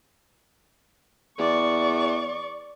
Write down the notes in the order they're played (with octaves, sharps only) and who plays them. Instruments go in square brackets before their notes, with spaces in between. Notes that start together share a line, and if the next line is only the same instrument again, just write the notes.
[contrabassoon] E2 [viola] D5 C#6